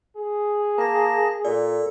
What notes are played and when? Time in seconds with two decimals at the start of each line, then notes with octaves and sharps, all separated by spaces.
0.17 G#4
0.78 A#3 A5 A#6
1.45 A#2 A4 D5